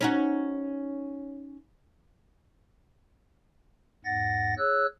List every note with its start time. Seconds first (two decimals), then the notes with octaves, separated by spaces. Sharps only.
0.01 C#4 D#4 F#4
4.05 E2 G#2 F#5 A6 A#6
4.58 G#4 C#5 E6 F#6